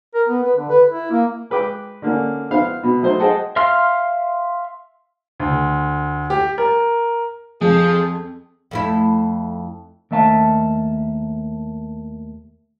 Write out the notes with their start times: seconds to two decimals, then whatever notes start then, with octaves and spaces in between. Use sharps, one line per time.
0.14 A#4
0.28 B3
0.43 B4
0.56 D3
0.70 B4
0.90 E4
1.11 A#3
1.50 G#3 B4 G5 D6
2.02 D3 A#3 C#4
2.51 B3 E4 C5 F5 F6
2.83 B2
3.01 F#3 A3 D#4 C5
3.20 G#4 C5 D#5 F#5 G5 A5
3.56 E5 F5 C6 F6
5.40 D2
6.30 G4
6.58 A#4
7.61 F2 F3 G#4
8.71 F2 A3 E4
10.11 D#2 A3 E5 A5